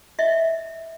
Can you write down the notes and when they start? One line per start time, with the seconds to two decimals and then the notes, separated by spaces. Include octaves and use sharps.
0.19 D#5 E5